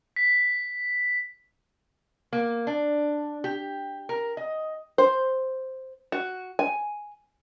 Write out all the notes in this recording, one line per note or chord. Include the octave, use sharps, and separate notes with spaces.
B6
A#3
D4
G4
A#4
D#5
C5
F#4
G#5